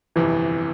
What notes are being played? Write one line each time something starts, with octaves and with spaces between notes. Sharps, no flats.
G1 F2 C3 E3